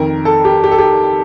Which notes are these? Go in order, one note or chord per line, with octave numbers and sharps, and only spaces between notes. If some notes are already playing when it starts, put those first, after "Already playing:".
Already playing: F2 D#3 A#4
A4
G4
G4
A4
G4